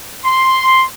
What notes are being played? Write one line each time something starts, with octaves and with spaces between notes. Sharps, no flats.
C6